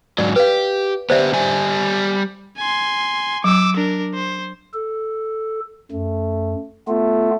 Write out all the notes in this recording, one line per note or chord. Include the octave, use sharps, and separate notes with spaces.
G#2 F#3 D5
G4 B4 F5
B3 G4 C5 D5 E5
G3 G#5
G#5 C6
F#3 D6 E6
D4 A#4
C5
A4
F#2 A3
A3 B3 F4